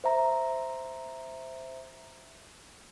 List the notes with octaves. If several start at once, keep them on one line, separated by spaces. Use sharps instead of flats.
C5 E5 A#5